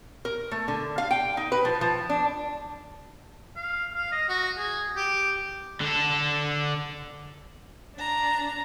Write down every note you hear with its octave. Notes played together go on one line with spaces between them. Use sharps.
A#4
A3
D3
F5
G5
D#4
B4
F3
F3
D4
F5
F5
D#5
F#4
G#4
G4
D3 A4
D4 A#5